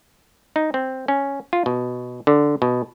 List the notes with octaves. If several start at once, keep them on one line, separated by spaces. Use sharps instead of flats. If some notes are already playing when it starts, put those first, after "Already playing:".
D#4
C4
C#4
F4
B2
D3
B2